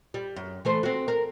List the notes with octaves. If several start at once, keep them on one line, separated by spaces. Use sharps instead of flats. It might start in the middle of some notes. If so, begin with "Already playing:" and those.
G3
F#2
E3 A3 C5
C4 F#4
A#4